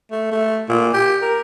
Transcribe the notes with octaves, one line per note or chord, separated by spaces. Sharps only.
A3
A3
A#2
G4
A#4